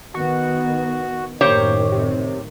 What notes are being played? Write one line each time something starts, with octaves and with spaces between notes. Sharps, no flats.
D#3 B3 F#4
F#2 A2 D#3 A#3 G4 C5 C#5
C3